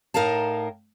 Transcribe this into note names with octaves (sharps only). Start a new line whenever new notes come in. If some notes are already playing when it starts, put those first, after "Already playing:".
A2 D#4 A#4 F5 A5